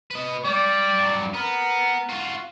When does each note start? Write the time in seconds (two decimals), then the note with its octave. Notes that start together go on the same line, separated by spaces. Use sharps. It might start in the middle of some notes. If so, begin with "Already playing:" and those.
0.11 B4 D#5
0.45 G3 D5
0.98 G2 F#3
1.34 B3 A#4
2.09 F4 F#4